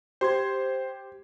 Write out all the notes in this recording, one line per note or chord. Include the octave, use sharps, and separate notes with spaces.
G4 C5 C6 G#6